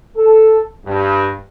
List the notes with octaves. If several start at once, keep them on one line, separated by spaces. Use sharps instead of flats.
A4
G2